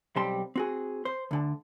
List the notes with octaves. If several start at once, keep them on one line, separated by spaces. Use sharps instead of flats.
B1 G3 C4 G4 A5 C6
C4 F#4 G#4
C5
D2 D3 A5